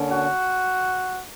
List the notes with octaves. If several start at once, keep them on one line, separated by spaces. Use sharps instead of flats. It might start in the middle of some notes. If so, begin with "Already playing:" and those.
Already playing: D3 A#3 C#4
F#4